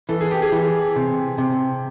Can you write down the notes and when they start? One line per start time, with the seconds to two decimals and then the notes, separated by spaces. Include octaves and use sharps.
0.09 E3 A4
0.21 G#4
0.31 G4
0.42 G#4
0.52 E3
0.96 C3
1.38 C3